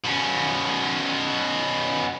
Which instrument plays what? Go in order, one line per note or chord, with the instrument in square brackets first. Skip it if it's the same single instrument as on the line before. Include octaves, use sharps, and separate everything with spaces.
[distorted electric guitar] B2 C#4